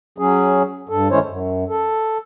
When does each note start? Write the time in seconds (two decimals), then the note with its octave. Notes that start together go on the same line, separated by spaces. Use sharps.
0.18 F#3 C#4 G#4
0.89 G2 A4
1.11 D#3 G#3 C#4 E4 C5 C#5
1.24 F#2
1.69 A4